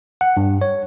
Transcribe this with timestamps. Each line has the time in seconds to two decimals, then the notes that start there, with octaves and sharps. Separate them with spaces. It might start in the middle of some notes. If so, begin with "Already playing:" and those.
0.21 F#5
0.37 G2
0.61 C#5